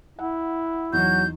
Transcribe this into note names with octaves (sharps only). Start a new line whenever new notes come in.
E4 F#5
E2 F#3 D#4 F#4 G6